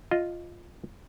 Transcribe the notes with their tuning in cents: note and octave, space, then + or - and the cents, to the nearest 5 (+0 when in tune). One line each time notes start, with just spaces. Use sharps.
F4 +0 D#5 +0